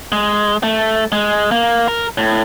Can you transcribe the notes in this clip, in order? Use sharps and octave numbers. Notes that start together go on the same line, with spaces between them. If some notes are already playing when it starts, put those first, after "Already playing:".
G#3
A3
G#3
A#3
A#4
A2